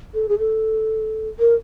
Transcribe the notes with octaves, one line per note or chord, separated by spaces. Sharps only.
A4
G#4
A4
A#4